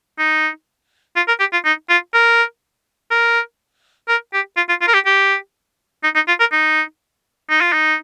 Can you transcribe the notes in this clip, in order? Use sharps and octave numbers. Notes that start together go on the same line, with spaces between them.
D#4
F4
A#4
G4
F4
D#4
F4
A#4
A#4
A#4
G4
F4
F4
F4
A#4
G4
G4
D#4
D#4
F4
A#4
D#4
D#4
F4
D#4